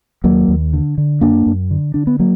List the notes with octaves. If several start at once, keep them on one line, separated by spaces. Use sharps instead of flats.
D#2 F#3 A#3
D#2
D3
D3
F#2 A#3 D4
F#2
D3
D3 D4
B3
F#3 A#3